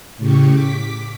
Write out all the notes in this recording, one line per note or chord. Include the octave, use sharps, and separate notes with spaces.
A2 C#3 G4 C#6
D6 B6